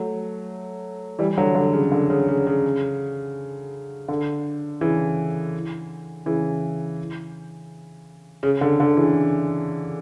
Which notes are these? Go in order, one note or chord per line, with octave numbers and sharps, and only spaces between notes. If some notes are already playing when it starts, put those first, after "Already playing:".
Already playing: F#3 A3
E3 G3
D3 F#3
D3
C#3
D3
C#3
C#3
C#3
D3
C#3 E3
C#3 E3
C#3
D3
D3
C#3 E3